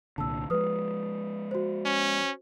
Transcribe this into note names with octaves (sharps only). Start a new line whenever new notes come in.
C2 A#2 D3 A5 E6
F3 G#3 B4 D#6
F#4 C5
C#4